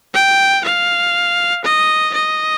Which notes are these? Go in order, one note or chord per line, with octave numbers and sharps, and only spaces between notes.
G5
F5
D#5
D#5